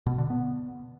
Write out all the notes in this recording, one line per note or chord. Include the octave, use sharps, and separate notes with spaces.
B2
D3
B3